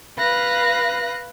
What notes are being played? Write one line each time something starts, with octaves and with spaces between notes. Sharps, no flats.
B4 F5 B5 F#6 A#6